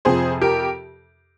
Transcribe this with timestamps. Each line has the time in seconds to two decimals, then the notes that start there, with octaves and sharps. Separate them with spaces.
0.05 F2 C3 F3 G#4 C5
0.42 G4 A#4